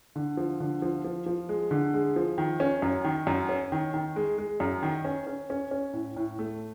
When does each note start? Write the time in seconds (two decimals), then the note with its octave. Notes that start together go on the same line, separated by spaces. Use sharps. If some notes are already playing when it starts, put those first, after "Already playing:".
0.16 D3
0.37 F3
0.60 D3
0.82 F3
1.04 F3
1.26 F3
1.49 G#3
1.71 D3
1.94 G#3
2.16 F3
2.38 D#3
2.60 C#4
2.82 F#2
3.04 D#3
3.27 F#2
3.49 C#4
3.72 D#3
3.94 D#3
4.16 G#3
4.38 G#3
4.60 F#2
4.83 D#3
5.05 C#4
5.27 C#4
5.50 C#4
5.71 C#4
5.93 A2
6.16 A2
6.39 A3